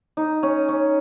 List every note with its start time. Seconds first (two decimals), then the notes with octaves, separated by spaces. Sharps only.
0.17 D#4
0.43 C#4
0.69 C#4